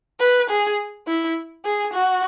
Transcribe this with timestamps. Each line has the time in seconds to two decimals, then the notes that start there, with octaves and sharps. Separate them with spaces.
0.20 B4
0.50 G#4
1.07 E4
1.65 G#4
1.94 F#4